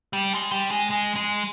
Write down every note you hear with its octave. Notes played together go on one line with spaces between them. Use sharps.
G3
G#3
G3
G#3
G#3
G#3